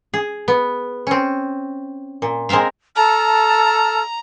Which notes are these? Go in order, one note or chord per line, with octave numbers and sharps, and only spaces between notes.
G#4
B3
C4 C#4
A#2
G#3 C4 A#4 E5 F5
A4 A5 A#5 F6